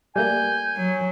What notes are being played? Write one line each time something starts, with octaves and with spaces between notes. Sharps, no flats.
G3 A3 A#3 G#5 G6
F#3